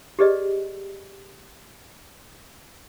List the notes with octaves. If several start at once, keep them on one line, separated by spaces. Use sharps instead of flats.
G4 G#4 B4 D5 D#5